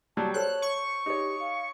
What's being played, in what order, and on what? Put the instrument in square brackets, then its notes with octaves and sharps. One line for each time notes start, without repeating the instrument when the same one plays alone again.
[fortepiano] F#3 G3 [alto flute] A5
[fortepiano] A4 C5 [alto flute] C#5 [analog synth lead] F#6
[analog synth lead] C#6
[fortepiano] D#4 C#5 [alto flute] G4
[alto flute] F5